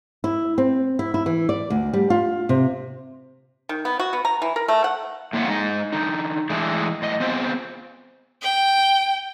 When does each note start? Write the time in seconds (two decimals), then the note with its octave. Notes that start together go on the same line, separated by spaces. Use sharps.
0.24 E4
0.58 C4
0.99 E4
1.14 E4
1.26 E3
1.49 D5
1.70 D2
1.93 G3
2.10 F4
2.49 C3
3.69 D#3
3.85 B3
4.00 F#4
4.13 B3
4.25 A#5
4.42 E3
4.56 A#4
4.68 A3
4.84 F#5
5.33 A2 A#3 F4 C#5 E5 F#5
5.48 G#3 D#4 D#5
5.93 D3 D#4
6.50 E3 G#3 A3 D4
7.02 A2 D#5
7.20 B3 C4 F4 G#4 C5
8.42 G5